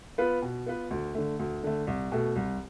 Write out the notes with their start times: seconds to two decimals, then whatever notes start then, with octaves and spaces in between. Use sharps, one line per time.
0.18 B3 F4 B4
0.42 B2
0.66 B3 F4 B4
0.91 D2
1.15 D3 A3
1.39 D2
1.63 D3 A3
1.87 C2
2.12 B2 A3
2.36 C2